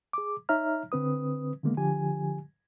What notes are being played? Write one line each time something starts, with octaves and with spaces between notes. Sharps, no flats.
G#4 D6
D#4 C#5 E5 A#5 F6
D3 C4 B4 D#6
D3 D#3 G#3 A#3 B3
D3 F3 G4 G#5